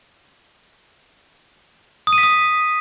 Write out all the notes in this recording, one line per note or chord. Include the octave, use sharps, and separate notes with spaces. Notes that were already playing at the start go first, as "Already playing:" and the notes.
D#6
D#7
B6
D#6